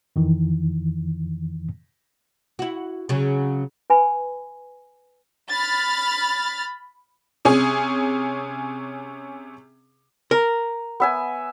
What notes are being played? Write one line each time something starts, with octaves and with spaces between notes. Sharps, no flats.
F2 D#3 E3
E4 F#4
C#3 F#3
B4 G#5 B5
B5 F6 A6
C3 C#4 G#4
A#4
B3 E5 G#5